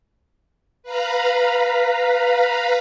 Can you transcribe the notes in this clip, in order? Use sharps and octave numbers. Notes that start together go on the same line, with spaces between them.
B4 F5 A#5 B5